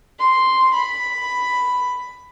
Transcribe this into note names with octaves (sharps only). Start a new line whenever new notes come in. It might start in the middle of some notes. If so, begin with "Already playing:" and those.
C6
B5